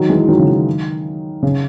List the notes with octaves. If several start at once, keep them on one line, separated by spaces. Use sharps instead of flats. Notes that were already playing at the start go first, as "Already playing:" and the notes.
Already playing: D#3 F#3
E3 G#3
D#3 F#3
C#3
D#3
C#3